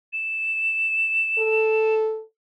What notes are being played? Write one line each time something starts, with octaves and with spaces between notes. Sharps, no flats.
E7
A4